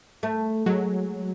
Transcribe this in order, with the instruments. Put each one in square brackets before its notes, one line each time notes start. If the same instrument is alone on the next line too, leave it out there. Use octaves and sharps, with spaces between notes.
[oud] A3
[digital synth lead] F#3 [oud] G#3